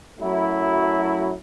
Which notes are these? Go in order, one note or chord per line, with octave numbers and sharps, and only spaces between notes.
F#2 F#3 A3 E4